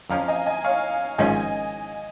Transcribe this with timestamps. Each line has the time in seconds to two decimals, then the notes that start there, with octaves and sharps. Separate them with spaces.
0.10 F2 F3 C#4 F5 A#5
0.28 D#5 G#5
0.46 D#5 G#5
0.64 C#5 F5
1.18 G#1 G#2 F3 C#4 F4 D#5 G#5